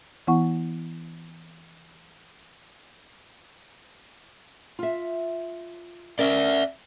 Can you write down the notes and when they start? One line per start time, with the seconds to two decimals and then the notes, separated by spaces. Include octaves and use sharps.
0.27 E3 B3 E4 F#5 C#6
4.79 F4 E5
6.19 C#4 A#4 D5 E5